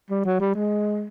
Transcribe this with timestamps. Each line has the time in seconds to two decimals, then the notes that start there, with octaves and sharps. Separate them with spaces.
0.10 G3
0.25 F#3
0.40 G3
0.55 G#3